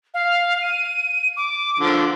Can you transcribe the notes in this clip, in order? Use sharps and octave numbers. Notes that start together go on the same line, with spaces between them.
F5
D#7
D6
D3 F3